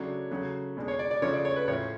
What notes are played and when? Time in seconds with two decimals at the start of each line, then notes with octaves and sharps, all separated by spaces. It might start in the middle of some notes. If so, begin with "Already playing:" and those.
Already playing: C#3 F#3 A3 D4 C#5
0.30 C#3 F#3 A3
0.77 B2 G#3 D4
0.88 C#5
0.99 D5
1.11 D5
1.22 C#3 F3 A3 D4 C#5
1.33 D5
1.45 C#5
1.56 B4
1.68 A2 F3 A3 C#4 C#5